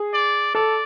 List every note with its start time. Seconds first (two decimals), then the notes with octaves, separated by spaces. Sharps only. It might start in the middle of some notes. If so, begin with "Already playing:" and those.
Already playing: G#4
0.14 D5
0.55 A4 D5